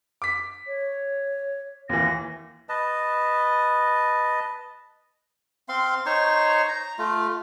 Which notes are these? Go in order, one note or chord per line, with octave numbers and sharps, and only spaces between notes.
D6 B6
C#5
D#2 E3 A#6
B4 D#5 A5
C4 F5 C6
D#4 C5 C#5 C#6
A#5
A3 F4